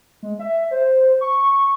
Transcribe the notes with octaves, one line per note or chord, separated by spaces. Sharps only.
G#3
E5
C5
C#6